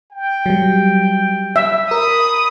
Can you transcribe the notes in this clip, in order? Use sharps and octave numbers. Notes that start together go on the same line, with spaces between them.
G5
F#3 G3
E5
A#4 B5 D#6